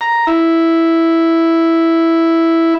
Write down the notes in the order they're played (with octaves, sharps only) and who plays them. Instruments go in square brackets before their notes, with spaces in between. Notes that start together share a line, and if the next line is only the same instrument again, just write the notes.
[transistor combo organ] A#5
E4